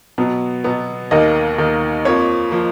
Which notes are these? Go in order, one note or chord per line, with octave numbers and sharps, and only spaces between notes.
B2 F#3 B3
B2 F#3 B3
D#2 D#3 A#3 D#5
D#2 D#3 A#3
F2 F3 A#3 C#5
F3 A#3